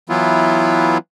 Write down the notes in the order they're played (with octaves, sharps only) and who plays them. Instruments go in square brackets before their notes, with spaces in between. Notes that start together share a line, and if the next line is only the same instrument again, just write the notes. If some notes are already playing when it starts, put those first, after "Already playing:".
[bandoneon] E3 F#3 B3 E4 F4